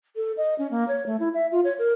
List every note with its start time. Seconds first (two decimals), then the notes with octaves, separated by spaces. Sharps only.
0.16 A4
0.37 D#5
0.59 C#4
0.71 A#3
0.88 C#5
1.06 A3
1.20 E4
1.34 E5
1.52 F4
1.64 C#5
1.79 A#4